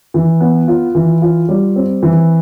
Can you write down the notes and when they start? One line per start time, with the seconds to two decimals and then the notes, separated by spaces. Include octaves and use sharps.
0.14 E3
0.40 B3
0.68 F4
0.95 E3
1.22 F4
1.49 G3
1.76 C4
2.03 E3